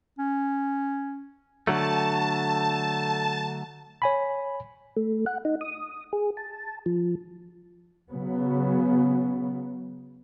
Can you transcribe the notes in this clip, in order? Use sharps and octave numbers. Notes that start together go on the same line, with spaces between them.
C#4
D3 F#3 A3 A5
C#5 G#5 B5
A3
F#5
D#4
D#6
G#4
A5
F3
C#3 F#3 B3